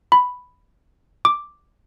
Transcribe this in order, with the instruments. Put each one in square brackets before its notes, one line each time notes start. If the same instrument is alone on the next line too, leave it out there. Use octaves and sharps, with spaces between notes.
[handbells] B5
D6